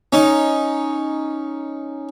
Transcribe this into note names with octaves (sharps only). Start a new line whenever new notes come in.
C#4 D#4